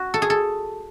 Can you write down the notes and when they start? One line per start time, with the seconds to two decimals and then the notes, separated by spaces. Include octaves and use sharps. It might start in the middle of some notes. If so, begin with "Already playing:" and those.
Already playing: F#4
0.14 A4
0.22 G#4
0.30 A4